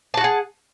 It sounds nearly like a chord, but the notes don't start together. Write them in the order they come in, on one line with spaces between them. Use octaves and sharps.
A5 F#4 F#5 G#4